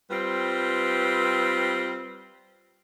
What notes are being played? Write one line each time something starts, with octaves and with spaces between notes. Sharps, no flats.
G3 C4 F4 B4